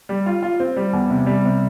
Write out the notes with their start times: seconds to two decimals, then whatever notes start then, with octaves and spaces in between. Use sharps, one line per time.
0.09 G3
0.26 F4
0.42 F4
0.60 C4
0.76 G3
0.93 E2
1.10 C3
1.26 G3
1.44 C3